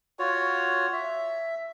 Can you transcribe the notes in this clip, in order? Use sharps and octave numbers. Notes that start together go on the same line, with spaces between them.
F4 F#4 C#5
E5